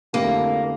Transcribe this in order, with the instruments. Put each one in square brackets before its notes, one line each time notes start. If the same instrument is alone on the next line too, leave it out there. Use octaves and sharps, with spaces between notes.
[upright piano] F2 D3 A3 E4 G4 [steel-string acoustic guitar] A#3